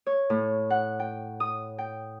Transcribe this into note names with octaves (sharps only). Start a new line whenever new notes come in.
C#5
A2
F#5
G5
D#6
G5